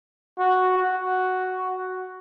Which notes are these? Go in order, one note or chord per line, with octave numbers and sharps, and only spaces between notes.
F#4
F#4